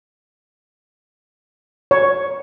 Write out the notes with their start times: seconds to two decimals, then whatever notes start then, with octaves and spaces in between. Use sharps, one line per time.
1.91 C#5